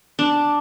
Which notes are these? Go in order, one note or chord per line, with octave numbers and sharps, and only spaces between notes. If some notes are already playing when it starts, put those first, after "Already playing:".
D4